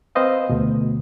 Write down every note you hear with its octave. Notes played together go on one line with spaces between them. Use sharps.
C4 B4 C5 D#5 F5
D2 B2